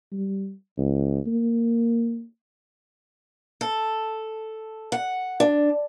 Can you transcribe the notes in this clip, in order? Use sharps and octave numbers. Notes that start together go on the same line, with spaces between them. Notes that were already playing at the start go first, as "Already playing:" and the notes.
G3
C#2
A#3
A4
F#5
D4